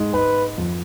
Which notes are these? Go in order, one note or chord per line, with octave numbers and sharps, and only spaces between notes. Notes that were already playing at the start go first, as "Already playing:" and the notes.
Already playing: G#2 G#3
G#2 G#3 B4
F2 F3